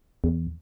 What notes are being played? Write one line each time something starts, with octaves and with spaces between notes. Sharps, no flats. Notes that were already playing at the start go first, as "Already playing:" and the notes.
E2